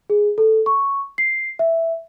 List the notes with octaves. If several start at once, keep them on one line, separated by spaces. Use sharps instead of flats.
G#4
A4
C#6
C7
E5